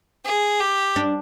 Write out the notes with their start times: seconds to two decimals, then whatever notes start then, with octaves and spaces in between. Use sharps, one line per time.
0.25 G#4
0.60 G4
0.96 D4